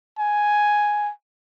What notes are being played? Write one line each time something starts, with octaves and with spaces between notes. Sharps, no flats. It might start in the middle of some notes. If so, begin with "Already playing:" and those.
G#5